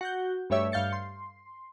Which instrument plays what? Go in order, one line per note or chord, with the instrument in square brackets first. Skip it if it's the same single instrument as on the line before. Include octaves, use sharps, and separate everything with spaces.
[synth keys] F#4 F#5 G6
G2 A3 G4 C#5 E5
G2 F5 G6 A6 C#7
C6